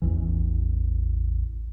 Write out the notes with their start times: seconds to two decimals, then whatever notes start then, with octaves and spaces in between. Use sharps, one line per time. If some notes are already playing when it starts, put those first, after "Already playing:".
0.02 A1 E2 E3